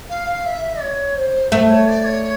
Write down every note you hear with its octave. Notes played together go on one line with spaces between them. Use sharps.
F5
E5
C#5
C5
A3 C5
C#5
D5
C#5